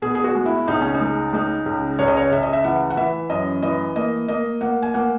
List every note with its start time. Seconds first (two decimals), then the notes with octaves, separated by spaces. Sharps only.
0.02 B2 G#4
0.15 G#4
0.24 F#4
0.35 G#3
0.46 E4
0.68 C#2 D#4
0.81 C#4
0.94 D#4
1.01 G#3
1.33 G#3 D#4
1.66 C#2
1.99 C#2 C#5
2.08 D#5
2.17 C#5
2.31 C#2 E5
2.43 D#5
2.53 E5
2.64 E3 F#5
2.90 F#5
2.97 E3 E5
3.30 F#2 D#5
3.63 E3 D#5
3.96 A#3 D#5
4.28 A#3 D#5
4.61 A#3 F#5
4.82 G#5
4.94 A#3 F#5